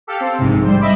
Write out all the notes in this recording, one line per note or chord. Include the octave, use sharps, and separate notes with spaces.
G4 A4 F5
C4
A#1 G#2 C3
G3 C5
D#5 E5 B5 D6